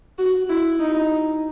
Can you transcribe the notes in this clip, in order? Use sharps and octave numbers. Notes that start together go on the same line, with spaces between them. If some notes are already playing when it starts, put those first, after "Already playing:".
F#4
E4
D#4